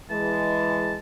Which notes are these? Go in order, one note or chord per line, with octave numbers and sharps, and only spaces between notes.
E3 G#3 A5